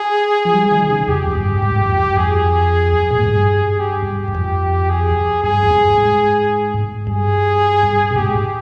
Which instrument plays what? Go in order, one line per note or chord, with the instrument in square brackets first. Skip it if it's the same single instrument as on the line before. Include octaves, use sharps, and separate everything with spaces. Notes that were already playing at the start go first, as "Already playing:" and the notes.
Already playing: [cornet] G#4
[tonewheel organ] F3
G3
D#3
C#3
[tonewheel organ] F2 [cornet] G4
[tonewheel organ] F2
G2
G#2
G2
F2
G2
[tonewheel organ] F2 [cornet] G#4
[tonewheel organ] A#2
G#2
G2
[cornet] G4
[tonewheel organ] G2
F2
[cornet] G#4
[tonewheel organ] G2 [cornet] G#4
[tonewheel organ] F2
G2
G#2
[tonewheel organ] G2 [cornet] G#4
[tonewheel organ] A#2
[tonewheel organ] G#2 [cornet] G4